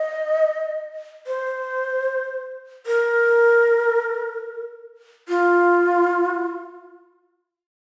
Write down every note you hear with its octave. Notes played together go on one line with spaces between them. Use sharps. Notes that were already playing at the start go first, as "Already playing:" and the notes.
Already playing: D#5
C5
A#4
F4